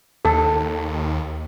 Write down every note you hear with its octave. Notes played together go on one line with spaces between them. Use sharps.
D#2 A4